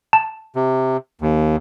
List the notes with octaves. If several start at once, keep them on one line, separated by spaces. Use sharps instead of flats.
A5
C3
D#2